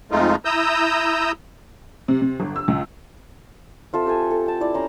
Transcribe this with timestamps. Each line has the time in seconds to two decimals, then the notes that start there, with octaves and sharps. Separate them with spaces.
0.11 F2 G#3 A3 D#4 F4
0.45 E4 A#5 D#6 E6 G6
2.08 C3
2.21 C3
2.40 G1
2.56 E6
2.68 C#2
3.93 C4 F4 A4 E5
4.06 G4 A4 G5 G#5
4.31 A4
4.46 G5 A5
4.60 E4 D5
4.74 C#4 A#5 C6